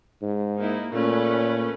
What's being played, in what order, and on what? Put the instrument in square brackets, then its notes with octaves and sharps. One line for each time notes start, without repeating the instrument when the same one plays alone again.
[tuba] G#2
[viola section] A#3 D#4 E4
[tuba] A#2 [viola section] A3 C#4 B4